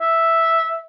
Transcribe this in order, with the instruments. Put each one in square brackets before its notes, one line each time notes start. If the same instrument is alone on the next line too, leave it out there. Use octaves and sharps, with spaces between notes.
[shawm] E5